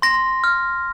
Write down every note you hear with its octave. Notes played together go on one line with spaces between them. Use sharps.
C6 A#6
F6